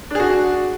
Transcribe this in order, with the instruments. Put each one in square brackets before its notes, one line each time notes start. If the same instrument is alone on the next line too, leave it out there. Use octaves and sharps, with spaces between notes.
[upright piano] D4
G#4
F#4